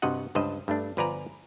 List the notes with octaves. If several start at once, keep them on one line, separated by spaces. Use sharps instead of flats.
G2 C3 F#4 D#5 F#5
C#2 G2 C5 D#5
G2 A3 D4
G1 F3 B4 D5 G#5 A#5